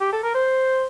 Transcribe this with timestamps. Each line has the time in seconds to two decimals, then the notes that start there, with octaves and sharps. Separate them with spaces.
0.01 G4
0.13 A4
0.23 A#4
0.35 C5